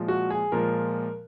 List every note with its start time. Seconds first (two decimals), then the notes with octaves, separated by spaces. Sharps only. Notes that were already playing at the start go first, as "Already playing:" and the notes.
Already playing: A#2 F3 G#3
0.08 F#4
0.31 G#4
0.52 A#2 F3 G#3 A#4